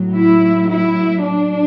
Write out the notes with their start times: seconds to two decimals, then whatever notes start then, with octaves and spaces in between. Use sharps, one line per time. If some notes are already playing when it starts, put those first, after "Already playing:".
Already playing: A2 F#3
0.15 E4
0.69 E4
1.23 D4